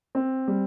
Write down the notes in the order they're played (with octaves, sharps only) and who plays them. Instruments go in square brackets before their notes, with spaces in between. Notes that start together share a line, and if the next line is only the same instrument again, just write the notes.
[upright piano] C4
G3